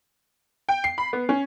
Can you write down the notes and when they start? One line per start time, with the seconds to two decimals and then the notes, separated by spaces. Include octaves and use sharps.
0.69 G5
0.84 C7
0.98 B5
1.13 B3
1.29 C#4